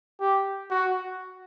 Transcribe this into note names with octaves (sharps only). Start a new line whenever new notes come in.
G4
F#4